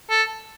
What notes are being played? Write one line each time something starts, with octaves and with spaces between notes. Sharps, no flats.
A4